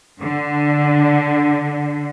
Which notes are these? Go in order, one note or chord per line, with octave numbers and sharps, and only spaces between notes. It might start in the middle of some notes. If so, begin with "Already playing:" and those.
D3